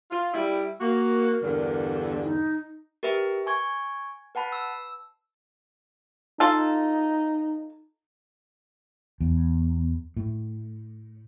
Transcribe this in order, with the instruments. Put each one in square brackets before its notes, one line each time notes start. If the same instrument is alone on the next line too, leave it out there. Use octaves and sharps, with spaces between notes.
[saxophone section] F4
G3 E4
[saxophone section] A#3 F#4 [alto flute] A#4
[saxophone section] E2 G2 D3
[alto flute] D#4
[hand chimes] G4 A#4 B4 E5
G#5 C#6 G#6
B4 F#5 A5 B5
E6
[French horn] D#4 [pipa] F4 A4
[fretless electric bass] E2
A2